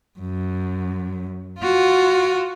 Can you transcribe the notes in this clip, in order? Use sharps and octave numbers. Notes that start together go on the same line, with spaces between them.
F#2
F4 F#4